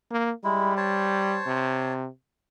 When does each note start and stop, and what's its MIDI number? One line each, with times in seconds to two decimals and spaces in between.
0.10 0.31 58
0.44 1.39 55
0.44 0.74 56
0.44 0.74 64
0.77 1.93 72
0.77 1.93 73
0.77 1.93 81
1.46 2.07 48